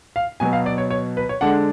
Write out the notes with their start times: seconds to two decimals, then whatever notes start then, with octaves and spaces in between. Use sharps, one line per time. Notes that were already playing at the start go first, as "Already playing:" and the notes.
0.16 F5
0.40 B2 F#3 B3 G#5
0.53 F5
0.66 D5
0.78 C#5
0.91 C#5
1.17 B4
1.29 C#5
1.41 D3 G#3 D4 F#5